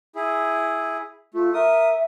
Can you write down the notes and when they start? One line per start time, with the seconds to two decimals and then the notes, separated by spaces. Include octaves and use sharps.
0.15 E4 G#4
1.34 A3 F4
1.54 A#4 E5 D#6